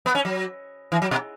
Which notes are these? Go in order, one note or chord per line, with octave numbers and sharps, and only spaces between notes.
B3
C#4
F#3
E3
F#3
B2